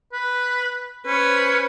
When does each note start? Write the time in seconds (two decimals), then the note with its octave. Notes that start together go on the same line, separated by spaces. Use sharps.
0.12 B4
1.06 C#4 B4 C5